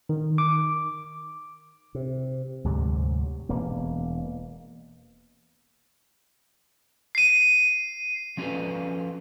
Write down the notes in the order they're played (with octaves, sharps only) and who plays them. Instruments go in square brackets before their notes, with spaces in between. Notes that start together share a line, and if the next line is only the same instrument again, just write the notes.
[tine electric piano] D#3
D6
[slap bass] C3
D2 G#2 C3 F#3
E1 A#3
[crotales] C7 D#7
[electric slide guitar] F3 C#4 F4 F#4 A4 B4